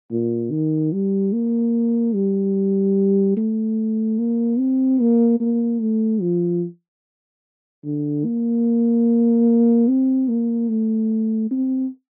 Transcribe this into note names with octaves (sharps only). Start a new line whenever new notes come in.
A#2
D#3
G3
A#3
G3
A3
A#3
C4
A#3
A#3
A3
F3
D3
A#3
C4
A#3
A3
C4